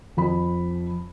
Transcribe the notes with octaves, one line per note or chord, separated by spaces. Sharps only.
F2 B5